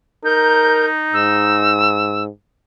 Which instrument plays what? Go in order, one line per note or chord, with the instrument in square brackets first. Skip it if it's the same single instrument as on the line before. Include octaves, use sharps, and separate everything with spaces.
[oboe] D#4 [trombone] A#4 [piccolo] G6
[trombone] G#2 [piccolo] E6